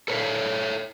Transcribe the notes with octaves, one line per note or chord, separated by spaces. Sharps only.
A4 B4 C#5 D5 E5 F5